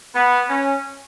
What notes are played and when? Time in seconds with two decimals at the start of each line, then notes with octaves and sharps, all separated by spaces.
0.15 B3
0.49 C#4